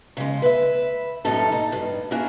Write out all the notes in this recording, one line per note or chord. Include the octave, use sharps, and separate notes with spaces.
C#3 G#3
B4 E5
F#2 A2 G3 D#4 A4 C#5
D#4
G2
A#3 D4 E4 F#4 G#4